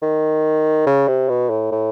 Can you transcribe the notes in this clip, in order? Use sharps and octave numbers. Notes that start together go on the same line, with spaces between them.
D#3
C#3
C3
B2
A2
A2